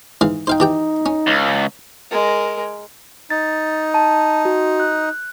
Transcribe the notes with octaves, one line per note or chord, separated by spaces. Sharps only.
G#2 E3 F5
D#4 C5 F5 G5
E3 G4 G5
C#4
C#2
G#3 A#4
D#4 A6
A5
F#4
F#6